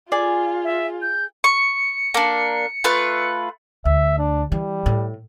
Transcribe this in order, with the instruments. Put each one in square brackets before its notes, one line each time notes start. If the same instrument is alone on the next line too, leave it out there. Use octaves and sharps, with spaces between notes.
[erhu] F4 [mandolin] G#4 [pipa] D5
[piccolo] E5
G6
[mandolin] C#6 [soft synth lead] C#7
[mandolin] A#3 D4
A3 F4 B4
[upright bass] D2 [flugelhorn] E5
[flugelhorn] D4
[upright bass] E3 [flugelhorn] G3
[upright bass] A2